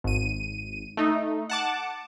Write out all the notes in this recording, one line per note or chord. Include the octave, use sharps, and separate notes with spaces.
G#1 D#7
A3 D#4
F#5 A5 D6